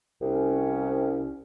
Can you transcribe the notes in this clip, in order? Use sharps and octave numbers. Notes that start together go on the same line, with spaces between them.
C2 C#4